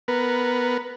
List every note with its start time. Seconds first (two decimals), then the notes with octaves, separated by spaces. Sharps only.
0.08 B3 A#4 B4